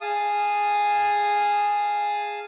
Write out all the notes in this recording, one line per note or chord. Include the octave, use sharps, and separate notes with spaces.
G#4 F5 A5 D#6